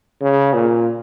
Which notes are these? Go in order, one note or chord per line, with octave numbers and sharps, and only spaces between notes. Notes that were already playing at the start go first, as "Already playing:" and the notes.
C#3
A#2